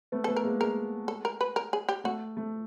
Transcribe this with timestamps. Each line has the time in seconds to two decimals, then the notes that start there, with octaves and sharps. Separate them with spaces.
0.12 A3 B3
0.24 A4
0.28 A3 B3
0.36 A#4
0.43 G#3 A#3
0.60 G#3 A#4
1.08 A4
1.25 A#4
1.41 B4
1.56 A#4
1.73 G#4
1.89 G4
2.04 A3 F#4
2.37 A3